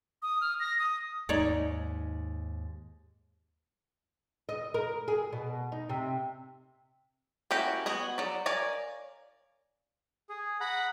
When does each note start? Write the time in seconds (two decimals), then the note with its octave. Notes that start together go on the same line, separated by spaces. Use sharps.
0.22 D#6
0.41 F6
0.60 A#6
0.79 D#6
1.29 D#2 G#2 D#4 C#5 D5
4.49 D#5
4.74 A#4
5.08 G#4
5.33 B2
5.72 D#4
5.90 C3
7.51 A#3 C#4 E4 F#4 G4
7.86 B3 F#4 G#4
8.18 F#3 D5
8.46 A#4 C#5 D5 F5 G#5
10.29 G#4
10.61 F#5 A#5 B5